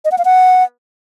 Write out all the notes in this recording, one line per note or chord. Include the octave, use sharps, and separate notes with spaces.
D#5
F#5
F5
F#5